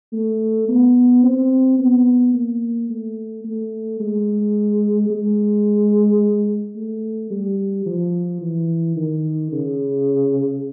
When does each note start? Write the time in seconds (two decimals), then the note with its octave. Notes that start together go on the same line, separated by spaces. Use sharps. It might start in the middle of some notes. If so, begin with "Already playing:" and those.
0.13 A3
0.68 B3
1.24 C4
1.79 B3
2.34 A#3
2.89 A3
3.44 A3
4.00 G#3
5.10 G#3
6.76 A3
7.31 G3
7.86 F3
8.41 E3
8.96 D#3
9.52 C#3